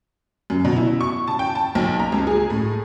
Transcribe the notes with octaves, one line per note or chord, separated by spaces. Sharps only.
F#2
B2
E4
C#6
A5
G5
A5
B1
A#5
C#2
G#4
A2